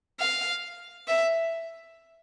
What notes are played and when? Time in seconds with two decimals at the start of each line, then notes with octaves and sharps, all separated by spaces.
0.20 F5
1.08 E5